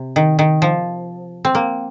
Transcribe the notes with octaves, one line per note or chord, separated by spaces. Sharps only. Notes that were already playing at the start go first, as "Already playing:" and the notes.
Already playing: C3
D#3
D#3
F3
C4
A#3